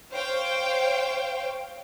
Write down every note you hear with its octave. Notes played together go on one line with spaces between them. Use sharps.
C5 C#5 F5 G5